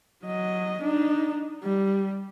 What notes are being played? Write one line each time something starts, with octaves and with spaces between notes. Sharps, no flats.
F#3 D#5
D4 D#4
G3